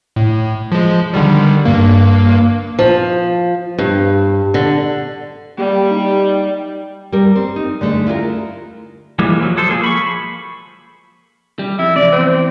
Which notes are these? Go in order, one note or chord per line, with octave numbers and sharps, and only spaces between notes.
A2
F3 G#3
D3 D#3 G3
G2 A#3
F3
G2
D3
G3 A#3 G4
D#4
G3 A#4
C4
D#4
D3 G#3 A3 D4
E4 F4 G#4 A#4
E3 F3 G3 G#3 A#3
F3 F#3
G#3 A4 C5
F3 A#3 G#4
B5 C#6
G3
F2 E4
E2 C3 D5
C4